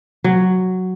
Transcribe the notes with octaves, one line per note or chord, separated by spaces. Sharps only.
F#3